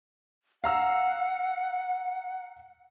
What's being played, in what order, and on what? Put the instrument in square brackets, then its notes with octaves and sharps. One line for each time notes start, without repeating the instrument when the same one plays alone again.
[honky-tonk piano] F5 A#5 E6 [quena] F#5